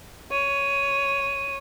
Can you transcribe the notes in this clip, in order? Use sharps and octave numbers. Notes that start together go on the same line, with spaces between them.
C#5 D#7